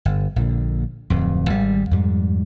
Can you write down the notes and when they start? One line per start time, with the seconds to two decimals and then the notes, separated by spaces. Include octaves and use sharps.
0.05 G1
0.36 A#1 A#2 D3
1.10 D1 F2
1.50 G#1 G3
1.91 F2 G#2 G3